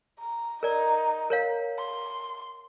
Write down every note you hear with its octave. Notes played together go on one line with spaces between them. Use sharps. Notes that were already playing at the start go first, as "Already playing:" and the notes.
A#5
D#4 A#4 D5
A#4 C#5 F5
C6